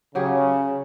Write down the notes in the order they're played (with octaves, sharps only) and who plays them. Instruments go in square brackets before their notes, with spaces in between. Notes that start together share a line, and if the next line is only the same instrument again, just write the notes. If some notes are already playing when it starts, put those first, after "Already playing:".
[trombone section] C#3 [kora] F#3 G4 G#4